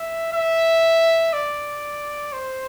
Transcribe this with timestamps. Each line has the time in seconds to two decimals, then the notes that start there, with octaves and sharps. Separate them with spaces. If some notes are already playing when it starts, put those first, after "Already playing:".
Already playing: E5
0.33 E5
1.33 D5
2.33 C5